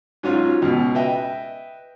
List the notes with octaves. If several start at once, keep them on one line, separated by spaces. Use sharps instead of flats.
G#2 F#3 C#4 F4
C#2 B2
B4 D#5 E5 G5